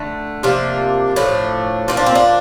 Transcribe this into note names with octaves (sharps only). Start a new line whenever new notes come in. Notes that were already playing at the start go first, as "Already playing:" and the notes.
Already playing: D3 A3
C3 F3 A#3 D4
A2 F3 A3 D4
A#2 F3 A#3 C4
D4
C4
D4